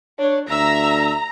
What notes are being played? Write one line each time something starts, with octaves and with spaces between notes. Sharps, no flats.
D4 C#5
D2 E5 A#5 E6